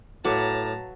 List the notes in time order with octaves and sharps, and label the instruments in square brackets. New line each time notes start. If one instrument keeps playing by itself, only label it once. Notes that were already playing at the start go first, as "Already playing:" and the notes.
[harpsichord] A2 D6 [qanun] F#3 B4 F5 [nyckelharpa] A5 A#5